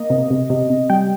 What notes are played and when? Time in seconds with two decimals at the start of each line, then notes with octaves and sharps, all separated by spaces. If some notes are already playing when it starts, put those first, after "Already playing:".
Already playing: A#3 D#5
0.10 C3
0.30 C3
0.50 C3
0.70 C3
0.90 G3 G5